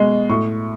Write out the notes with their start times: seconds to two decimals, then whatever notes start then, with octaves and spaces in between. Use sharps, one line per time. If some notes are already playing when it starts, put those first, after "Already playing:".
Already playing: B2 G#3
0.29 A2 C#6